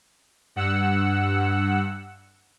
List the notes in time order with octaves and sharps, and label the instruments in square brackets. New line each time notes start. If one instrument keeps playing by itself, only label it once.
[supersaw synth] G2 F#5 E6